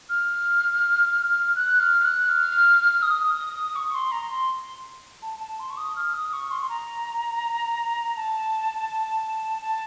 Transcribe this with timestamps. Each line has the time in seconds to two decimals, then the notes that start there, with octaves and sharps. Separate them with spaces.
0.09 F6
1.56 F#6
1.80 F6
2.05 F#6
2.29 F6
3.03 D#6
3.76 C#6
3.89 C#6
3.95 C6
4.12 A#5
4.30 C6
5.22 A5
5.40 A5
5.60 C6
5.70 C#6
5.77 D#6
5.96 F6
6.14 D#6
6.33 C#6
6.51 C6
6.62 C6
6.69 A#5
8.16 A5
9.62 A5